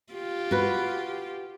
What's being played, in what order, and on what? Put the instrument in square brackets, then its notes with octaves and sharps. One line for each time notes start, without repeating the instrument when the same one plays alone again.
[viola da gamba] F4 G4
[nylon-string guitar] F#4 B4